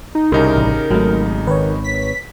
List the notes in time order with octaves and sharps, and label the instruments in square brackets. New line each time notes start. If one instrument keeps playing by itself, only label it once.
[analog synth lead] D#4
[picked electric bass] C2 [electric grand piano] C#3 D#4 G4 [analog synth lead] A#4
[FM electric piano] A1
[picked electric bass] G#1 [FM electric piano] F#3 A3
[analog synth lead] D#3 [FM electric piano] B4 C#5
[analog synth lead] B6